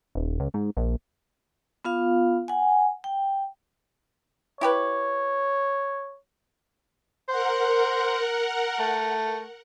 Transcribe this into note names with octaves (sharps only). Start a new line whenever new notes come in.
D#1
C#2
G#2
A#1
B3 F4 F5
F#5 G#5
G5
E4 G4 B4 C#5
A#4 C5 F#5
A3